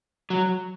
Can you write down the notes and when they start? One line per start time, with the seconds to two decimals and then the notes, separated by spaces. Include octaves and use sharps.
0.30 F#3